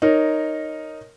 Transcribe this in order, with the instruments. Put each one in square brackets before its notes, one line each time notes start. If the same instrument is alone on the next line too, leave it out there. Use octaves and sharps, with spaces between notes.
[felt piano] D#4 A#4 C#5